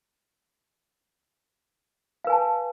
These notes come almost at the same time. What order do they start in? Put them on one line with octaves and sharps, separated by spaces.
F5 B4 G#5 A5